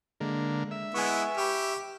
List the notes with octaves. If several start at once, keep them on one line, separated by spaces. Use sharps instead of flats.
D3 G#3 A#3
E5
G#3 B3 E4 G#5 C#6
G4 B5 C#6 F6